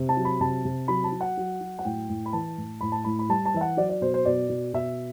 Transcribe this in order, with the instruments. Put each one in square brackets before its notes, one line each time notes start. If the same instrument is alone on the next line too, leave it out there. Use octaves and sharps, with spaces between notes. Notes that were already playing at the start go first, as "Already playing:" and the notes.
Already playing: [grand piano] C3
A5
F#3
B5
C3 A5
C3
F#3 B5
A5
F#3
F#5
F#3
F#3
F#5
A2 G5
A2
B5
E3 A5
A2
A2 B5
A5
A2 B5
B5
G3 A5
A5
E3 E5
F#5
F#3 D5
D5
B2 C5
C5
B2 D5
B2
B2 E5